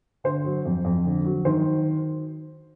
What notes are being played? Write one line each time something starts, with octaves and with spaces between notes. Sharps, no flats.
D3 C5
F#3
F2
F2
D3
F#3
D#3 C5